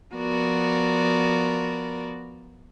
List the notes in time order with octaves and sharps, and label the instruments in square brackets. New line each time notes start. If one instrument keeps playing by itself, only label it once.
[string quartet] F3 B3 F#4 A#4 D5